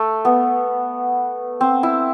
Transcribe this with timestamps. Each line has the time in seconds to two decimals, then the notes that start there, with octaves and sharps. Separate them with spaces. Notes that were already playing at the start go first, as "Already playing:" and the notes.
Already playing: A3
0.25 B3
1.61 C4
1.83 E4